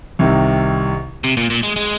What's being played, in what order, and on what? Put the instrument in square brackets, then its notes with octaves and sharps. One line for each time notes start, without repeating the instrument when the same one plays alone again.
[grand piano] C2 C3 D#3
[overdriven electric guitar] C3
A#2
A#2
G#3
G#3